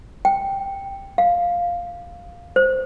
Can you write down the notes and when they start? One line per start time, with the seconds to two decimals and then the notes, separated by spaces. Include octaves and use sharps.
0.25 G5
1.18 F5
2.56 C5